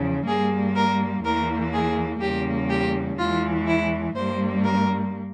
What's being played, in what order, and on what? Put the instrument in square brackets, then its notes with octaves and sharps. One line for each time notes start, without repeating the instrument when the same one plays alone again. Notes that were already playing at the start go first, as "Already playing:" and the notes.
Already playing: [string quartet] E2 C#3 F3
G2 G3 A#3 G#4
A#4
E2 E3 A#3 A#4
G#4
E2 C#3 G3 A#3 G4
G4
E2 E3 G#3 F4
E4
G2 G3 A#3 C5
A#4